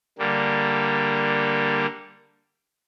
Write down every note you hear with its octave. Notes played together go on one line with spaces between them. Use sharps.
D3 G3 A#3